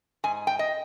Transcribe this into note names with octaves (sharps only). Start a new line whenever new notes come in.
G#2 G#5
G5
D#5